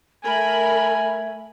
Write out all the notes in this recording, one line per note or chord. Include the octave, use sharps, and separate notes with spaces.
A3 A#4 G#5 B5